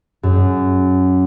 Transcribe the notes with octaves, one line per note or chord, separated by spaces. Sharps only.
F#2